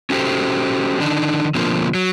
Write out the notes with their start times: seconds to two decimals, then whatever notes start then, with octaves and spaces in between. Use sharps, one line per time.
0.10 C#4 F#4 G4 A4 C5
1.00 D3 D#3 D4 D#4
1.55 B2 D3 F3 A#3 C4
1.94 F#3